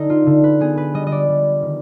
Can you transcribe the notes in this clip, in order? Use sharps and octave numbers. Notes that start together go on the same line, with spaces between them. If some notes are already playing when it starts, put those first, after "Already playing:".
Already playing: D3 D#4
F4
D3
B4
B3 G#4
B4
G3 D#5
D#5
D5
G3
D#3